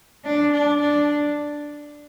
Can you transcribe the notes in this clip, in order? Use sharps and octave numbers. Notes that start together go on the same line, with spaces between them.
D4
D4
D4